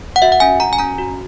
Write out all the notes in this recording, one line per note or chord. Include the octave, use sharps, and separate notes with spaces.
F#5
F#4 E5
F#5
C#4 G#5
F#4 A#5
G#5
C#4 A#5
F#4